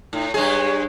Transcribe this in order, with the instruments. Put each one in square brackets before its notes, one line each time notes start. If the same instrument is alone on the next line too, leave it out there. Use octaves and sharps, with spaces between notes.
[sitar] A2 [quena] D#4
[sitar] G2 G#3 G#4 [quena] C#5